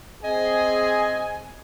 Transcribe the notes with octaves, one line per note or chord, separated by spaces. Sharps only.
C4 G#4 D#5 G#5